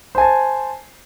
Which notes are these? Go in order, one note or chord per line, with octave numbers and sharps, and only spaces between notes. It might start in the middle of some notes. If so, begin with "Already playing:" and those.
C5 G#5 A5